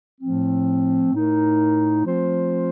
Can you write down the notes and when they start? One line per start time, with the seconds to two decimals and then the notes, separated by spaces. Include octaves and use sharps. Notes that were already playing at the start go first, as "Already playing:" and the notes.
0.21 A2 F3 A3 C4
1.13 A2 A3 D#4 A#4
2.06 F3 A3 C4 F4 C5